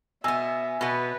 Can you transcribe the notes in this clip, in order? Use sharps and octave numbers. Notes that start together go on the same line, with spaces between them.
B2 B3 E5 G#5 E6
B2 B3 B4